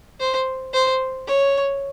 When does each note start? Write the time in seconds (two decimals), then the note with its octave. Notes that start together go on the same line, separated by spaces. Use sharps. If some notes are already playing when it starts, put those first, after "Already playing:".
0.20 C5
0.73 C5
1.27 C#5